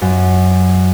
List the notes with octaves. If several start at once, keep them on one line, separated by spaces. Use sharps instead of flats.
F#2